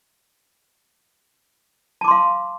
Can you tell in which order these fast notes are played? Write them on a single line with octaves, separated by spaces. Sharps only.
A5 D6 C6 F5